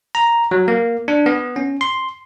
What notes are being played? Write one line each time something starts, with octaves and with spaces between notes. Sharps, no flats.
A#5
F#3
A#3
D4
B3
C#4
C6